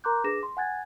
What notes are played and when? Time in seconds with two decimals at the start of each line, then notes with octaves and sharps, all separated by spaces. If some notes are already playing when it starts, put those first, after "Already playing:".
0.04 A#4 A#5 C6 D6 F#6 G6
0.24 D4 G#4 B4 D6 A#6 E7
0.43 C6
0.57 F#5 G#5 F#6 G#6 A6